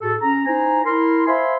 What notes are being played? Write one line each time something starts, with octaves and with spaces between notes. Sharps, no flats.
A2 F#4 G#4 A4
C#4 A#5
D#4 E4 C5 G#5 A#5
E4 A#4 C6
C5 E5 F5 G#5 B5 C6